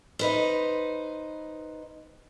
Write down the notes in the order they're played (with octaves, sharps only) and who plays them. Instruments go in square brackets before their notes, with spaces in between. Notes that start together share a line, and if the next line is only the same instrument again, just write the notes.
[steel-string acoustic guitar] D#4 B4 C5